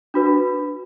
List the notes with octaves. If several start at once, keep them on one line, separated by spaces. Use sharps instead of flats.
D4 F#4 B4